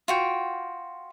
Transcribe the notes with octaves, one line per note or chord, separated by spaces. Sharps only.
F4 F#4 G5